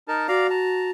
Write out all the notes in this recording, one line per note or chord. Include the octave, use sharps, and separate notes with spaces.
D#4 A#4 A5
F#4 D5 F5 A#5
A5 A#5